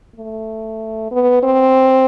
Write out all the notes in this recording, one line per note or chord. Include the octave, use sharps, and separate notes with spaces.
A3
B3
C4